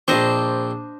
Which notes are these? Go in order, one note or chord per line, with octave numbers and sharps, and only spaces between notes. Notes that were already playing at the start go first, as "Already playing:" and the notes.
A#1 C4 D4 C5 D#5